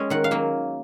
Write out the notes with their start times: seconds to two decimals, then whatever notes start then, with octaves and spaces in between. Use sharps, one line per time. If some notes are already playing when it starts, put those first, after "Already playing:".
Already playing: G#3 C#4
0.10 D#3 F#5
0.24 F5
0.31 F#3 A#3